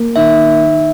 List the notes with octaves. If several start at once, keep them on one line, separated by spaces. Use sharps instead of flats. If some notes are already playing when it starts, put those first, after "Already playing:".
Already playing: A#3
D#3 E5